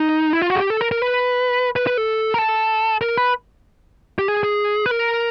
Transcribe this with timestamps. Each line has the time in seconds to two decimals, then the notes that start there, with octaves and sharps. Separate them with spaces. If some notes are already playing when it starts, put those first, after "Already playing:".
Already playing: D#4
0.33 E4
0.42 F4
0.50 F#4
0.56 G#4
0.60 G4
0.70 A4
0.81 A#4
0.91 A#4
1.02 B4
1.76 B4
1.87 B4
1.98 A4
2.34 A#4
2.38 A4
3.01 A#4
3.18 B4
4.19 G4
4.28 G#4
4.43 G#4
4.86 B4
4.91 A#4